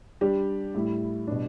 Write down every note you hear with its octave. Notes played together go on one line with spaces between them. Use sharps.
G3 D4 G4
A2 G3 E4
B2 G3 D4